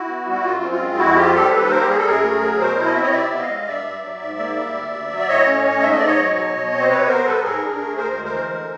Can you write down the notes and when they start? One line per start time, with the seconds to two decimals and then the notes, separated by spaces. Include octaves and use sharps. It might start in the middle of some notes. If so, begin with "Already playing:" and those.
Already playing: E4 F#4
0.08 B3
0.27 G3
0.32 E4
0.44 F#2 F4
0.63 C4
0.72 F4
0.80 G#3
0.98 F2 E4 F#4
1.16 C4 F4 G4
1.34 G3 G4 A4
1.48 C5
1.52 D#2 A4 B4
1.69 A#3 A#4 C5
1.81 G4
1.87 G3 G#4
1.98 A4
2.06 F#2 G#4 A#4
2.23 A3
2.42 F#3
2.59 B2 A#4 C5
2.77 E4
2.86 D#5
2.94 C4 E5
3.02 C#5 D#5
3.13 C3 D5 E5
3.31 B3
3.40 D#5 F5
3.49 G#3
3.67 G2 D5 E5
3.85 G2
4.03 F#3
4.22 G#2
4.39 A#3
4.56 G3
4.75 D2
4.93 D2
5.11 F#3
5.19 D5
5.28 A2 C#5 D#5
5.47 C#4
5.65 A3
5.82 G#2 E5
5.91 D#5
5.98 G#2 D5
6.06 C#5 D#5
6.18 F#3
6.36 B2
6.54 B2
6.71 C4
6.80 C5
6.89 C3 B4 C#5
7.07 B3 A#4 C5
7.25 G3 A4 B4
7.43 G#2 G#4 A#4
7.61 D4
7.79 A3
7.97 D2 A#4 C5
8.15 G#3
8.24 A#4 C5
8.33 E3
8.52 D3